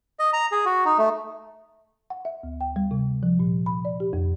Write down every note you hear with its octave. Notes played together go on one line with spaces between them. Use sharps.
D#5
A#5
G#4
F#4
D#4
A3
F#5
E5
D2
G5
G3
C3
F3
A#2
B5
D5
G4
F2